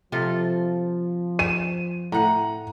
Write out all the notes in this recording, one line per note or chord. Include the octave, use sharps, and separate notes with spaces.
C3 F3 F4 A4
D#7 E7
A2 F#5 A#5